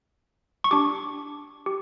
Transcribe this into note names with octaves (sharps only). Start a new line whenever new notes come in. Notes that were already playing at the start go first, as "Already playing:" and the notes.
C#6
D4 G4 D6
G4